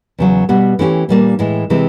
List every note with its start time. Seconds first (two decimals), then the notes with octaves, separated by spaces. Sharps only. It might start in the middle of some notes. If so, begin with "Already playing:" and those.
0.18 E2 C#3 F#3
0.49 B2 G3 B3
0.79 E3 A3 C#4 E4 G4
1.09 A#2 G3 A#3 D4
1.39 A2 E3 G#3
1.70 C3 E3 G#3 C4